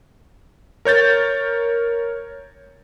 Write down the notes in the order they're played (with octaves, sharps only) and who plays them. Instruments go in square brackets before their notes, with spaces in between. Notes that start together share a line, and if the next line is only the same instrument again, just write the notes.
[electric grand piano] A#4 C#5 G6 A6